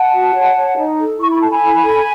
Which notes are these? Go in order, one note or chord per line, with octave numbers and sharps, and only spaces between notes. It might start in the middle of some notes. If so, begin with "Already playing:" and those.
Already playing: F#5 A5
F#4
C#5
C#5
D#4
A4
E4 C#6
B5
A4 A5
G#5 B5
E4
A4